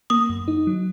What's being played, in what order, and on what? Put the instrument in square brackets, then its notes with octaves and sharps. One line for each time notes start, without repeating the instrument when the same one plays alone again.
[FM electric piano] A#3 [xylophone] D#6
[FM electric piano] F#2
D#4
F#3